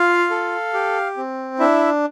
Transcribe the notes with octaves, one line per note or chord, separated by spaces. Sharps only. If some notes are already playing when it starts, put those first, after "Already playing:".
Already playing: F4 F5
A4
G4
C4
D4 E4 E5